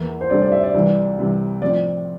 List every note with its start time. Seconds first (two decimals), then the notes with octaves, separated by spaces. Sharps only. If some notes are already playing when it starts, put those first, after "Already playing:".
Already playing: E2 E3 A#3 E4
0.21 C5
0.30 D2 C3 G3 D4 A4 D5
0.42 D5
0.52 E5
0.63 D5
0.74 C2 C3 E3
1.18 C2 C3 E3
1.62 A2 F3 C4 D5